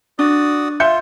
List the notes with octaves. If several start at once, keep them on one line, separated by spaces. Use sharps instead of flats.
D4 F#4 D5 D#6
F4 E5 G6 C#7